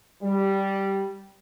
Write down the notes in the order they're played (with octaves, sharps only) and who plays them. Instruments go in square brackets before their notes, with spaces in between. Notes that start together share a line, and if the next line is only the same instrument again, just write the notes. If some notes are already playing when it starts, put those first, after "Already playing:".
[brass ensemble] G3